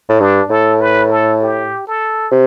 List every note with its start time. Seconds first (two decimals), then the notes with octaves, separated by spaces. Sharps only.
0.09 A2
0.20 G2 D4
0.50 A2 A4
0.81 B4
1.10 A4
1.42 G4
1.87 A4
2.31 C3